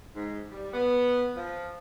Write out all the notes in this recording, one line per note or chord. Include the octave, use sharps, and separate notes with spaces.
G#2
G3
B3
F3